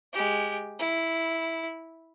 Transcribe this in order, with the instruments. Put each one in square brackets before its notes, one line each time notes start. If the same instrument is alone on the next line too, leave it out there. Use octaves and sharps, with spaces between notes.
[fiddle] G#3 G4
E4